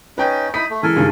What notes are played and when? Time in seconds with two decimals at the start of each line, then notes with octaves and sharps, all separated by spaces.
0.18 C#4 D#4 B4 G5 G#5
0.54 D#4 E4 D#6 B6
0.70 A3
0.83 E3 G#3 A4 A#4 G#5
0.96 C#2 G2 D#3